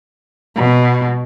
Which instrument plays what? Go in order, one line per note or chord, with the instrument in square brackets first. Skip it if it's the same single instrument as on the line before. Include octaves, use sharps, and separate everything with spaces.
[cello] B2